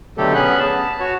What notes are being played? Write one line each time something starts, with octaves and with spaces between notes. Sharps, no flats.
B2 D3 F#3 A3 G4 A4
B3 C#4 G#4 B5 F#6
A5
F#4 C#5